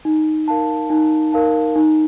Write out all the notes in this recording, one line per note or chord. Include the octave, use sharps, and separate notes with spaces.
D#4
A#4 F5 A5
D#4
A#4 F5 A5
D#4